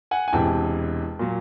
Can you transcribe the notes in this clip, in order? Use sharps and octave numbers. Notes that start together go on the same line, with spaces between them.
F#5 G#5
G#5
E1 E2 C3 E3 G5 A5
A#2 F#3